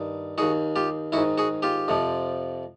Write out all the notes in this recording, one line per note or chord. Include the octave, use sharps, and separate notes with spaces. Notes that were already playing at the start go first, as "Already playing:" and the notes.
Already playing: G2 D#3
D#2 D#3 F#4 G#4
F4 G4
G#2 D#3 E4 F#4
F#4 G#4
F4 G4
F2 C3 F3